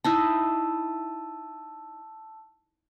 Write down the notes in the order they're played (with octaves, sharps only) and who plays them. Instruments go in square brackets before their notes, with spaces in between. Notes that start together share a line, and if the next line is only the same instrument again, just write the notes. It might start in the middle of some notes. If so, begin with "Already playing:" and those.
[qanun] D#4 E4 [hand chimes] A5 E6